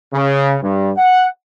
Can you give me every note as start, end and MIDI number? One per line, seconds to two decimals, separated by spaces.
0.13 0.56 49
0.62 0.90 43
0.97 1.27 78